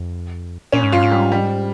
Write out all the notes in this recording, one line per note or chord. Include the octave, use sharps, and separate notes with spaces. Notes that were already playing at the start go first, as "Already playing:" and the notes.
Already playing: F2
A#2 C#4
G#2
G2 F4
G#2
G3
G3